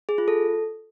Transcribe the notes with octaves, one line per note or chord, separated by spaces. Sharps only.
G#4
F4
A4